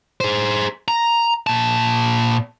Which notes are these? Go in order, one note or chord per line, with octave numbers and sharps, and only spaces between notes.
G#4 C5
A#5
A#2 A5